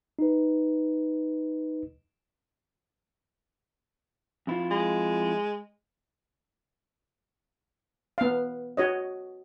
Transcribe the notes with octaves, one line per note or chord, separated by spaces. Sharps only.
D#4 B4
F2 E4 F4
G#3
B3 F5
F#4 C#5 D#5